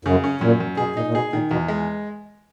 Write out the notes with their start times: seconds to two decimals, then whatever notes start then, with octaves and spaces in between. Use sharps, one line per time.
0.05 F#2 C#3
0.24 C#4
0.41 F#2 A#2
0.60 F#2
0.77 B2 G#4
0.96 A#2 D#4
1.07 A#2
1.14 B2 G#4
1.33 A#2 D#3
1.51 E2 B2
1.68 G#3